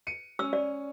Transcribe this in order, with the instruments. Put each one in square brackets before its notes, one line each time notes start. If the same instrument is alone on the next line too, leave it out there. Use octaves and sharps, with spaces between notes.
[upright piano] C#7 D#7
[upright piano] C#4 [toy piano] E6
[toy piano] D5